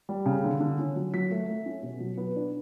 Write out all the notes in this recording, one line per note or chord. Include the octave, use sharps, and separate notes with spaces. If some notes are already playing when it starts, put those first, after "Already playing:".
G3
C#3
D3
D3
C#4
F#3
F#3 B6
A3
A3
C#4
B2
F#3
B3
D4